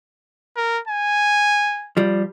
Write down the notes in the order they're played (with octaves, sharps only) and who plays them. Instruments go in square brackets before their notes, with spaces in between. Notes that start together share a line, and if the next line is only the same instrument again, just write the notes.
[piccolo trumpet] A#4
G#5
[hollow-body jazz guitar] F3 G3